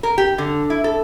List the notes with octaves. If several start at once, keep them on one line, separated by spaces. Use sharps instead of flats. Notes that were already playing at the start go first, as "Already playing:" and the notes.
A#4
G4
D3
E4
A4